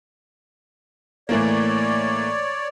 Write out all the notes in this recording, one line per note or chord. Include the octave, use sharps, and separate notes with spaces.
A2 E3 A#3 C#5 D5